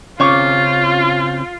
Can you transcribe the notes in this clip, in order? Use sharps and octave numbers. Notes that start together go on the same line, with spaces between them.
C#3 C4 C#4 F4 C#5 C#6 D6